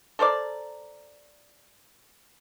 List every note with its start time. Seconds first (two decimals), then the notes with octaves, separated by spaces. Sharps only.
0.19 A4 A#4 C5 D5